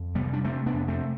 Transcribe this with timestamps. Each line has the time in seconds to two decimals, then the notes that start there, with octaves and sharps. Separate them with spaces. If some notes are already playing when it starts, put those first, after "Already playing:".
Already playing: F2
0.15 C3 G3 B3
0.33 D4
0.44 C3 A3 C4
0.66 B3 D4
0.74 F2
0.88 A3 C4